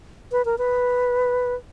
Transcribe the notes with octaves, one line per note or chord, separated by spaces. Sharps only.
B4
A#4
B4